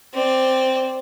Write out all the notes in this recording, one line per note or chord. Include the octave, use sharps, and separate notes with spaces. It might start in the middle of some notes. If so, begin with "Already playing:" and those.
C4 D5